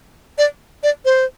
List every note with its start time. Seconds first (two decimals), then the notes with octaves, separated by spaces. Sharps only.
0.38 D5
0.83 D5
1.05 C5